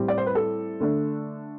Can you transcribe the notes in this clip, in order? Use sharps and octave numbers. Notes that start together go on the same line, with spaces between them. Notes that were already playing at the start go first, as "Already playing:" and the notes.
Already playing: A2 G3 C4 G4
D5
C5
B4
A4
D3 A3 D4